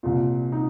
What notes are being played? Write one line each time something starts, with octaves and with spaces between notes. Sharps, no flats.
C2 A#2
D#4